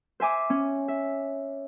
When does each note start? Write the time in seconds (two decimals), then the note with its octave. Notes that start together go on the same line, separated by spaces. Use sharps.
0.20 C5 E5 G#5 D6
0.50 C#4
0.88 E5